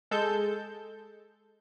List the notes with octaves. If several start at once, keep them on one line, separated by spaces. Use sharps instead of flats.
G#3 A4 G6